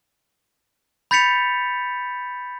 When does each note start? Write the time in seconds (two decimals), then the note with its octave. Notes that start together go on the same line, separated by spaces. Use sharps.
1.11 B5 G6 A6 B6 C#7 F7